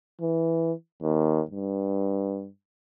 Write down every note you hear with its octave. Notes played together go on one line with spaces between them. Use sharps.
E3
D#2
G2